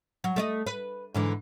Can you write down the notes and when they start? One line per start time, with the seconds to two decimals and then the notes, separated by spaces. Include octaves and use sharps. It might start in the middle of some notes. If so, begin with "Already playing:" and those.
0.24 F#3
0.36 A3 D5 D#5
0.67 B4
1.14 G#2 D3 E3